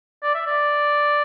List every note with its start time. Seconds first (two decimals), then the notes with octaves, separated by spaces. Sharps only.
0.23 D5
0.35 E5
0.47 D5